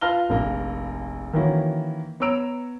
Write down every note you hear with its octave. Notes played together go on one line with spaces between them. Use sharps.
F4 B4 A5 F6 A#6 G7
F1 A#1 A#3
D#3 E3 A#3 C#4 E4 F#4
B3 C#5 A#5 E6 D7 F7